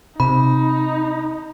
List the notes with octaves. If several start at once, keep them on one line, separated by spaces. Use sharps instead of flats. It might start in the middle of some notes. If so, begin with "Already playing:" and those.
C3 D#4 B5